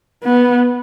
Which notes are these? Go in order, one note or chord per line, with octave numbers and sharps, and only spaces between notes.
B3